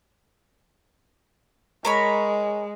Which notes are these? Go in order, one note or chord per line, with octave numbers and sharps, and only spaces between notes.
G#3 A#4 C#5 B5